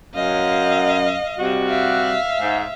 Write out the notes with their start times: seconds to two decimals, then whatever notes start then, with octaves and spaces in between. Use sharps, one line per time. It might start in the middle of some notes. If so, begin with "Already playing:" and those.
0.14 F#2 D#5 F5
1.38 C3 G3 F#4
1.68 E5 F5
2.41 G#2